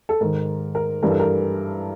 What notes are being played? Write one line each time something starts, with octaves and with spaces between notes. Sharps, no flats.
A4
G#2 D#3 A#4
A#4
G2 E3 A#4
A4
A#4